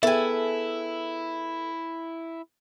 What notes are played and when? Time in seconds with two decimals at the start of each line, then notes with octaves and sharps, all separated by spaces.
0.03 B3 E4 G#4 A4 E5 G5 G#5